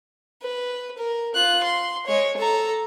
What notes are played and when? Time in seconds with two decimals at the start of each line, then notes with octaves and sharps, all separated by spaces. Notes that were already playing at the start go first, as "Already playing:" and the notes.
0.42 B4
0.98 A#4
1.35 F4 F#6
1.63 C6
2.06 G#3 C#5
2.37 A4 A#5